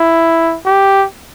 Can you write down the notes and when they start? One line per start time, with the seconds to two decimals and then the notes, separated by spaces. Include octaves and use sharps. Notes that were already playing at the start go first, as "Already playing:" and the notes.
Already playing: E4
0.66 G4